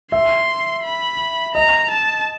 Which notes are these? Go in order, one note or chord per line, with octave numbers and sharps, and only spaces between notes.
E5 C6
B5
D#5 A#5
A5